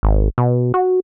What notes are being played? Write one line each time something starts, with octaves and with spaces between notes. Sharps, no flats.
G#1
B2
F#4